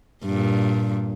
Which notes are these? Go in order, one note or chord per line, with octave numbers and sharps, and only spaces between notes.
G2 A#2